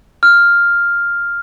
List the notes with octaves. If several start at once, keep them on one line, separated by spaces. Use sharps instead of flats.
F6